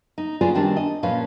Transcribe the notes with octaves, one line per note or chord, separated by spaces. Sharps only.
D#4
F4 F#4 G#4 B4 D5
D#3 G3 C4 D4
D#5
A#2 F3 C#4 B4 F5